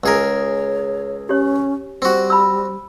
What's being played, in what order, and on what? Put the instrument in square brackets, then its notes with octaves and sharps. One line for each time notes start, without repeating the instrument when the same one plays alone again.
[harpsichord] C#2 G#4 A#4 [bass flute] C#5
[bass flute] C#4 [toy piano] G4 C#5
[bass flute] G3 [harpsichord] C4 F#4
[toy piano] B5 E6